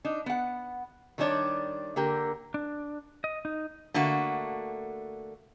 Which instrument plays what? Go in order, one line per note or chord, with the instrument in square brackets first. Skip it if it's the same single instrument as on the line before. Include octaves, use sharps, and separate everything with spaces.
[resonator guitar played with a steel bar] D4 D#4
B3 F#5
D#3 G3 A3 D4 C#5 D5
D3 A#3 G4 A#4
[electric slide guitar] D4
D#5
D#4
[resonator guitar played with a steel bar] D3 A3 A#3 F#4